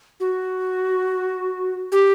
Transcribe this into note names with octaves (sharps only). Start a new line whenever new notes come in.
F#4
G4